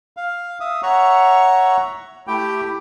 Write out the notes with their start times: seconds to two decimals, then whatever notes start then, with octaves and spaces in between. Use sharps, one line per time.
0.17 F5
0.60 E5 D#6
0.83 C#5 E5 F#5 A#5 C#6
2.27 A3 E4 G4 G5